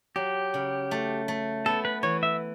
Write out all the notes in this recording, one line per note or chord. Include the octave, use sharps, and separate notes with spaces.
F#3 G4
C#3
A3
A3
B3 A4
B4
E3 C#5
E5